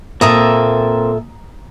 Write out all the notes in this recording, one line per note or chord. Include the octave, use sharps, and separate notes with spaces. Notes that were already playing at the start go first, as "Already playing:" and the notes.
A#2 A#3 C4 A4 E5 A#5 D#6